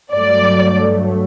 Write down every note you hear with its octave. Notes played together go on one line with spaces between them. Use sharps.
G2 F#3 A3 D5